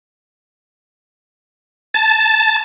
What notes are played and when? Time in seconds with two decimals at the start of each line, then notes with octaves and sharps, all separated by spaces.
1.94 A5